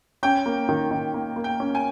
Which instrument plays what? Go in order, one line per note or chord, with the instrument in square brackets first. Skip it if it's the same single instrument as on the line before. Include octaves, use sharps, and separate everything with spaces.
[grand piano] C#4 [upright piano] G5
[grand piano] A#3
D#3
D#3
A#3
A#3
[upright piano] G5
[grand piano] C#4
[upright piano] G#5